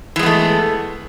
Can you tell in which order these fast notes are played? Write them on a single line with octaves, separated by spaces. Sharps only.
E3 G#3 B3 A3